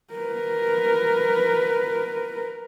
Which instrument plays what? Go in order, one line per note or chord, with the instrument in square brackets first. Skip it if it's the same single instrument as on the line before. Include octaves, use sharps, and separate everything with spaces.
[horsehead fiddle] A#4 B4